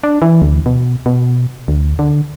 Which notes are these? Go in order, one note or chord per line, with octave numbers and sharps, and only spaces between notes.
D4
E3
D2
B2
B2
D2
D3